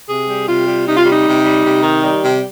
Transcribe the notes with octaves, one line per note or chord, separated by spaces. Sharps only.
C3 G#4
G3
C3 F4
G3
C3 D#4
F4
G3 D#4
C3
G3
C3
D#3
G3
C3